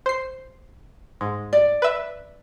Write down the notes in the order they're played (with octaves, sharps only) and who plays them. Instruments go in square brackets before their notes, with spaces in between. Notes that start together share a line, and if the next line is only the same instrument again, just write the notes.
[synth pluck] C5 C7
G#2
[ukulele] D5
[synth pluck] B4 E5